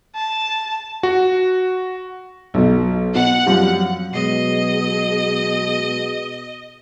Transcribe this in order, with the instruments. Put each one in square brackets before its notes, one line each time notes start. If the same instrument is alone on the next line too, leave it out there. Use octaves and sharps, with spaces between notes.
[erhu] A5
[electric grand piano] F#4
[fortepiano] B1 B2
[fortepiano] B2 [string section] F#5
[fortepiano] F#2 F3 G3
[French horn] B2 [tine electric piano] F#3 G#3 C7 [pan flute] G#4 [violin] D#5